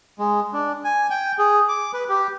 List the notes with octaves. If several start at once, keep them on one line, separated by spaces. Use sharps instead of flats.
G#3
D4
G#5
G5
G#4
D6
B4
G4